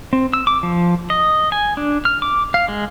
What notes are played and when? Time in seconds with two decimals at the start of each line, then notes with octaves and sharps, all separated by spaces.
0.13 C4
0.33 E6
0.47 D6
0.63 F3
1.10 D#5
1.52 G#5
1.77 D4
2.05 F6
2.22 D6
2.54 F5
2.68 G#3